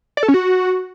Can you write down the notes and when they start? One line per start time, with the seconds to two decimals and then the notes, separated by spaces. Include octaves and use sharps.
0.17 D5
0.23 A4
0.28 C#4
0.34 F#4